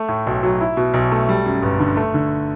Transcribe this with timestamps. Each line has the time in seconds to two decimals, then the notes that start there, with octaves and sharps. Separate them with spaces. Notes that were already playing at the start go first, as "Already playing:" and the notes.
Already playing: A3
0.09 A2
0.27 B1
0.43 F#3
0.61 E4
0.77 B2
0.94 B1
1.11 A3
1.29 G3
1.46 F#2
1.62 G1
1.80 D3
1.97 A3
2.14 D3